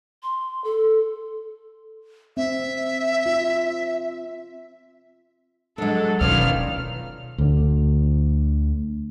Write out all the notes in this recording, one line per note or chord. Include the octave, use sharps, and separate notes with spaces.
C6
A4
C4 E5
F4
F#3 G#3 D4 A4
B2 D#3 E3 C#4 F4 D5 F6
D2 D3